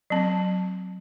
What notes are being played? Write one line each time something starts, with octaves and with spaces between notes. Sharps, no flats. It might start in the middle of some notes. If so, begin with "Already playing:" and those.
F#3 C4